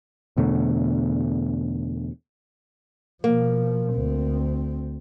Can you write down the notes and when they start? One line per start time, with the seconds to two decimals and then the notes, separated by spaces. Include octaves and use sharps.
0.37 E2 B2 D3 A3
3.24 B2 F3 A#3
3.93 D2 C4